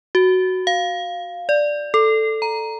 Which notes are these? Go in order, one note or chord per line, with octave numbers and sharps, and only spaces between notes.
F#4
F5
D5
A4
A#5